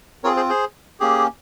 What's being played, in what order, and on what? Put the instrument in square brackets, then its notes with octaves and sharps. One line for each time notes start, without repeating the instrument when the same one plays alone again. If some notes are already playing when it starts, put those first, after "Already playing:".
[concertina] C4 F4 G#4 A#4 C#5
G#4 C5
G#4 C5
A#3 C#4 G4 G#4